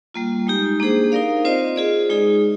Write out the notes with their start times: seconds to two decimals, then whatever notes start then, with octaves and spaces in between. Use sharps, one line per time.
0.14 G3 A#3 F4
0.47 G#3 D#4 G4
0.80 A#3 D4 G#4 C5
1.12 D#4 A#4 D5 F5
1.45 C4 F4 C5 D#5
1.76 F4 G#4 D5
2.09 G#3 D#4 G#4